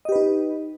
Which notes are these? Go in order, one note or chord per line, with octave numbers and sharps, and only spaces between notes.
D#4 G4 B4 D#5